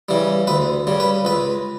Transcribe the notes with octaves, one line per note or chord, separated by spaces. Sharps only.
C#3 E3 G3
D2 B4
C#3 G3
B4
C#2 B4